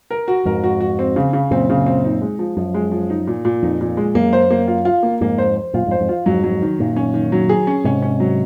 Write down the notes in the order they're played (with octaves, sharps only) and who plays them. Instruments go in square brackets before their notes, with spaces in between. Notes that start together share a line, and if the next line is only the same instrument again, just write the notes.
[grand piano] A#4
F#4
[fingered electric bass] F2 G#2 [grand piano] A#4
[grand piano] F#4
F#4
C4
C#3
C#3
[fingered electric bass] F#2 A#2 [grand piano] C4
[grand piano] C#3
C4
D#4
G#3
F3
[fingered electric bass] F#2 [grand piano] F3
[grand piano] G#3
F3
D#4
A#2
A#2
[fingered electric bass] F2 [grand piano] D#4
[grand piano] A#2
G#3
[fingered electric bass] F#2 [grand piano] A#3
[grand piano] C5
A#3
F4
F4
A#3
[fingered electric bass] F2 G#2 [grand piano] A#3
[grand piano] C5
C5
[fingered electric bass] F#2 A#2 [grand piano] F4
[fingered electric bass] F2 G#2 [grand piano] C5
[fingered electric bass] F2 G#2
[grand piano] F4
[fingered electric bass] F2 G#2 [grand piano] F#3
[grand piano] F#3
D#3
[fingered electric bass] F#2 A#2 [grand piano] D#3
[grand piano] C#4
D#3
F#3
G#4
C#4
[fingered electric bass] G#2 C3 [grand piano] C#4
[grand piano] C#4
F#3